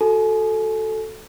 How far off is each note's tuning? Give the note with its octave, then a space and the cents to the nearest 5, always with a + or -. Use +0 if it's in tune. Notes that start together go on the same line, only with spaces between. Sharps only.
F#4 +0 A4 +0 G#5 +35